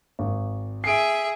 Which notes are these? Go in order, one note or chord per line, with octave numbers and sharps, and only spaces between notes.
G#1
G#4 E5 C7 D7